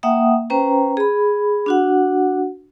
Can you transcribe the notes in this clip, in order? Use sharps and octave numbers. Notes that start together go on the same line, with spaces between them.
A#3 E5 F#5 G5 D#6
C#4 B4 C5 G5 A#5
G#4 B5
D4 F#4 F#5